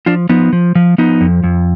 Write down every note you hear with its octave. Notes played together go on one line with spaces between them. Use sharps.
F3 D4 F4
F3 B3 D#4
F3
F3
F3 B3 D#4
F2
F2